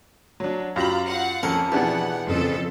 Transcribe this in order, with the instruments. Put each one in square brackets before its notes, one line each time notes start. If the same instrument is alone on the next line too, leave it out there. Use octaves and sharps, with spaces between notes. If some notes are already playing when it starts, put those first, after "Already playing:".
[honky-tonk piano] F#3 D4
[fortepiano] F#2 G4 [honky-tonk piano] F4 F#7 [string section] A#5 B5
[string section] F5 F#5
[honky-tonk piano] F2 [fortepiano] C#4 A4 [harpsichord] A#4
[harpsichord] E2 [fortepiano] B2 D4 G4 [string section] F#5
[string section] F2 A4 [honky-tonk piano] C#3